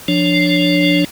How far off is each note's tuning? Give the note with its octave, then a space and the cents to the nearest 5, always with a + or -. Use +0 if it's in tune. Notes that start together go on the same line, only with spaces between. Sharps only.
F3 +0 D4 +0 C#5 +10